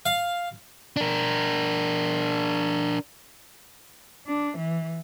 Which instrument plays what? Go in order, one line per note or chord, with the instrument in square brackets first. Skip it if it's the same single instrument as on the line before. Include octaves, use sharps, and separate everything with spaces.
[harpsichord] F5
[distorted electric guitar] D4 A#4
[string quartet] D4
E3